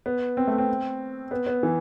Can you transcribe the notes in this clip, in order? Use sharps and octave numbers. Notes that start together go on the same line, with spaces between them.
B3
C4
A3
C4
B3
B3
E3